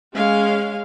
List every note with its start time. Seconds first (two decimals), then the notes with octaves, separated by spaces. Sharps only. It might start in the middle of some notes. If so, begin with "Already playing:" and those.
0.14 G#3 C#4 F5